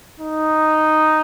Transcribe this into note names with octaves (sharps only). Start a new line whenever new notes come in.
D#4